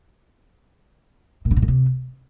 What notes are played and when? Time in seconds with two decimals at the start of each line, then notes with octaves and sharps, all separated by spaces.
1.45 A#2
1.51 D3
1.56 B2
1.62 A#2
1.68 C3